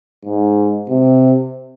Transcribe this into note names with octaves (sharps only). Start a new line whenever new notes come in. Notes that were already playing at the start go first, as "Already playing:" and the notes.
G#2
C3